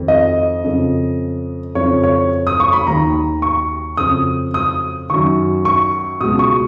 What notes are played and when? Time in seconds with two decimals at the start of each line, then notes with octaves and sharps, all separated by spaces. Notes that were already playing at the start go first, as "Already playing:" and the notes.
Already playing: F2 D#3
0.08 D#5
0.64 F2 C#3
1.75 F2 C#3 C#5
2.04 C#5
2.47 D#6
2.60 C#6
2.73 B5
2.87 D#2 D#3 A#5
3.42 C#6
3.97 F2 C#3 D#6
4.54 D#6
5.09 F#2 D#3 C#6
5.65 C#6
6.21 C#2 B2 D#6
6.39 C#6